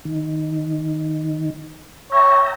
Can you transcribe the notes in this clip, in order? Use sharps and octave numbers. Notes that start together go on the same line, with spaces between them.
D#3
C#5 E5 G5 A#5